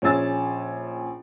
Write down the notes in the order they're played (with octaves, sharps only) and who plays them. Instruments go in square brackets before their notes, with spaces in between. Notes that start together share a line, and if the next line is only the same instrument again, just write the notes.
[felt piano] A#1 C#4 G#4 G#5 E6 A6